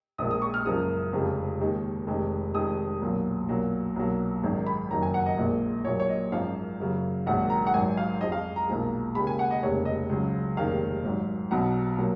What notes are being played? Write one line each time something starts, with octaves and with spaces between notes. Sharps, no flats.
A#1 A#2 F3 G#3 D#6
D#6
C#6
F6
F#1 F#2 F3 G#3 D#6
F1 F2 C#3 F3 G#3
D#2 D#3 G#3
F1 F2 D#3 G#3
F1 F2 D#3 G#3 D#6
B1 A#2 F#3
B1 A#2 F#3
B1 A#2 F#3
G#1 F#2 D#3 G#3
B5
F#1 F2 D#3 F#3 A#5
G#5
F#5
D#5
A#1 A#2 G#3
A#1 A#2 F#3 C#5
C#5
D#5
G#1 F#2 F3 G#3 F5
F#1 F#2 C#3 F#3
A#1 G#2 D#3 F#3 F#5
A#5
F#5
G#1 G#2 F#3 G#5
F5
F2 F3 G#3 D#5
F5
A#5
B1 A#2 F3 G#3
D#2 C#3 G#3 B5
G#5
F#5
D#5
F1 D#2 C#3 G#3 C#5
D#5
C#2 C#3 F#3
F1 D#2 D#3 G#3 F5
G#1 G#2 F#3
B1 B2 F#3 F#5
A#2 F#3